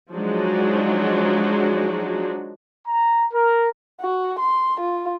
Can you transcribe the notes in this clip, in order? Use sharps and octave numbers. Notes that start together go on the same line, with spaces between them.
F3 F#3 G#3 D4 D#4 F#4
A#5
A#4
F#4
C6
F4